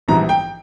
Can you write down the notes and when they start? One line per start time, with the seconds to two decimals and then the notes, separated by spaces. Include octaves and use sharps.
0.08 A#1 G#2 E3 G3 A#5
0.29 G5